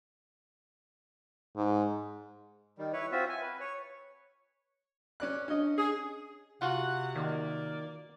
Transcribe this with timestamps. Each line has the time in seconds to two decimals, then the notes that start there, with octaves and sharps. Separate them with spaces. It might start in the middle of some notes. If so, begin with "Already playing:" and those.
1.56 G#2
2.78 D#3 G3
2.93 E4 B4 C#5
3.12 C4 F4 F#4 E5
3.29 G#5
3.41 B4
3.60 C#5
5.20 C#4 D5 F#6
5.48 C#4 D4 D#5
5.76 G#4
6.62 C3 F4 F#4 F#5
7.16 D#3 A#3 D5